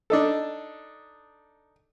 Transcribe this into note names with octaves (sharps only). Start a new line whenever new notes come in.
D4 D#4 A4